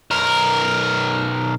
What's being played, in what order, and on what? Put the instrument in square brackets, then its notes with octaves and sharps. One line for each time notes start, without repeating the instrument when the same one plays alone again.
[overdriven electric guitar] B1 A#4